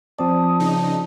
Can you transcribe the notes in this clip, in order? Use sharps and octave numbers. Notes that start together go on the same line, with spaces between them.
F3 C4 D5 A5 D#6
C#3 D#4